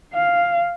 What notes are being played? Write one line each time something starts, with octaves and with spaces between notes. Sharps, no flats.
F5